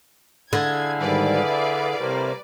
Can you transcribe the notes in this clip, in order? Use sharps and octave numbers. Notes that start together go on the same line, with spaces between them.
D3 E4 G#4 F5 G#6
G#2 D#3 G3 B4 D5
E5
A2 C3 G3 A#3 A#4 C5